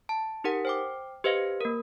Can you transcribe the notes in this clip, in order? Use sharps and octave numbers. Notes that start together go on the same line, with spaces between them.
A5
D#4 G4 A#4 F#5
C5 G5 D6
G4 B4 C5 D#5 F5
A#3 A#4